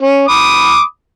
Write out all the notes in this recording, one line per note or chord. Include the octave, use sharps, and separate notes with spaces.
C#4
B5 D6 D#6